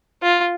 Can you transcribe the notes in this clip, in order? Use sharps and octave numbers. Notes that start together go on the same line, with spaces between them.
F4